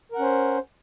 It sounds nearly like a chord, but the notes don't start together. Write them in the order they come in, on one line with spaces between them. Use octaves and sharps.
A#4 F#5 C#4 C5